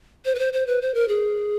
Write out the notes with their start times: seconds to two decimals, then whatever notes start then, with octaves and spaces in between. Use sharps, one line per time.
0.25 C5
0.35 B4
0.39 C5
0.53 C5
0.67 B4
0.82 C5
0.94 A#4
1.08 G#4